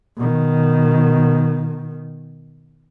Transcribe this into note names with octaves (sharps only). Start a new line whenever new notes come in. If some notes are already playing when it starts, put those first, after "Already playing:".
B2 D#3